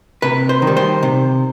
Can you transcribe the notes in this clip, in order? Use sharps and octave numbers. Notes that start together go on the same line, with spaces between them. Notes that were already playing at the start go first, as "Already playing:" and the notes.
C3 B4
C5
D#3
G3
C5
C3